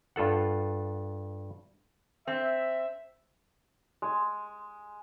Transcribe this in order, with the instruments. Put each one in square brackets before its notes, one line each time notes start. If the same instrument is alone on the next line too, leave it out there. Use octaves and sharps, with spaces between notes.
[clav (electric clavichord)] G2 F4 A4 F#5
[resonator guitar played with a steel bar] C4 [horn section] E5
[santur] G#3